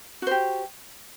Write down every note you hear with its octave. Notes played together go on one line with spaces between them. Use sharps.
F#4 G4 C5